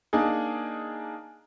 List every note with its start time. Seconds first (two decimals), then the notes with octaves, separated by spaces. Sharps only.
0.13 A#3 D4 D#4 G#4